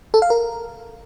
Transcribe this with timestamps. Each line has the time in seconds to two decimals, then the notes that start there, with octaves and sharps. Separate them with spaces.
0.14 A4
0.22 F5
0.30 A#4